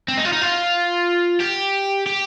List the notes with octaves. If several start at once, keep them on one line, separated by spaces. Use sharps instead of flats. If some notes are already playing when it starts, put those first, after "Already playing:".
C4
D#4
F4
D#4
F4
G4
G4